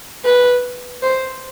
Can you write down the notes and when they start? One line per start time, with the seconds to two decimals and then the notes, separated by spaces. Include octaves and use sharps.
0.25 B4
1.02 C5